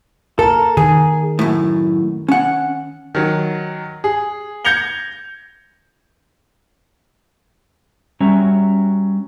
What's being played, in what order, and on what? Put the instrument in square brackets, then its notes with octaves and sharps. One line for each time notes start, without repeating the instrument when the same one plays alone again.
[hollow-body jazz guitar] A4 [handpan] A#4
[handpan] D#3 [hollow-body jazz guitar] G#4
[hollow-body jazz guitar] F#2 A2
C#4 F#5
[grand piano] D#3 F#3
G#4
G6 G#6 A#6 C#7 F7 G7
[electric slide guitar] G3 C#4 F#4 E5 A#5